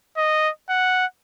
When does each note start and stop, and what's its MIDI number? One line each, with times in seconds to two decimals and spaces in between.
0.17 0.50 75
0.70 1.06 78